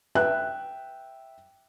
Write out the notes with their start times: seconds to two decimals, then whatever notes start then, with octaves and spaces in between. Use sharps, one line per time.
0.15 B4 E5 G5 F#6